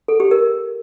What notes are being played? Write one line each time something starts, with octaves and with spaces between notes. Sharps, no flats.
A4
G4
A#4